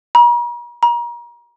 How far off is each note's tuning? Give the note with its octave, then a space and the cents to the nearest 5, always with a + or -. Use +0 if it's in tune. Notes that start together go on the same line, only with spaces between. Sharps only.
A#5 +45
A#5 +35